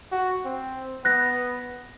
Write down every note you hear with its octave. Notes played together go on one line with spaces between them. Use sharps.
F#4
C4
B3 F#6 A#6